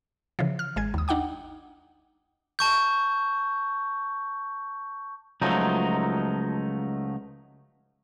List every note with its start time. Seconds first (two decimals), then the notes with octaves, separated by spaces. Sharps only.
0.39 C#3 E3 F3
0.59 F6
0.76 G#1 G#3 G#6
0.94 D#2 D#6
1.08 D4 D#4 F#5 G5 D6
2.59 A5 C#6 G6
5.42 C#2 F3 F#3 A3 D#4